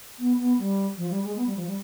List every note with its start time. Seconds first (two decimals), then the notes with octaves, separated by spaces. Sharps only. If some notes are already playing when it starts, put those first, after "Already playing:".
0.19 B3
0.39 B3
0.59 G3
0.97 F3
1.10 G3
1.24 G#3
1.37 B3
1.46 G3
1.56 F3
1.67 G3